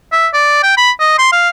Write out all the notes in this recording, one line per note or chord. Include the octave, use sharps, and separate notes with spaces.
E5
D5
G5
B5
D#5
C6
F5